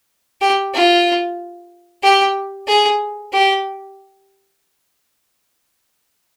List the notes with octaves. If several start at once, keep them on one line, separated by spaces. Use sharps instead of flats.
G4
F4
G4
G#4
G4